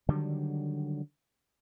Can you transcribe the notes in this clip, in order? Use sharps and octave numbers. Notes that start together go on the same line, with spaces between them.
D3 D#3 F#3 G3